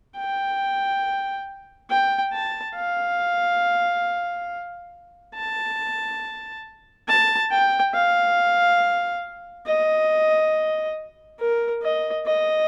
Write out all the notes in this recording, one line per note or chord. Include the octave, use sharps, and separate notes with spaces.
G5
G5
A5
F5
A5
A5
G5
F5
D#5
A#4
D#5
D#5